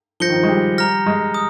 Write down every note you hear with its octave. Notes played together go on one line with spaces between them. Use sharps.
F3 G6 A#6 C#7 G7
D#3
F3
G#3
G3
A#5 F6 A#6
G#3
D#6